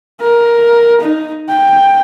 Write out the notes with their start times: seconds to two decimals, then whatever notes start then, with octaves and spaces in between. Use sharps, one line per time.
0.21 A#4
1.01 D#4
1.49 G5